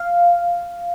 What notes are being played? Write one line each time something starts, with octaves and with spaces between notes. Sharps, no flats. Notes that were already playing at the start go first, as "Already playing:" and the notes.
Already playing: F5